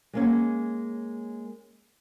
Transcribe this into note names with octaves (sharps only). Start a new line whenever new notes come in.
G#3 A#3 C#4